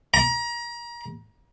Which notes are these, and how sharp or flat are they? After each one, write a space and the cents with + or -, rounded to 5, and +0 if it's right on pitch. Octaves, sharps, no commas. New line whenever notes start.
A#5 +30